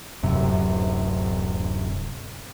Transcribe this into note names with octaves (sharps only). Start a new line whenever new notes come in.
D1 F#2 C3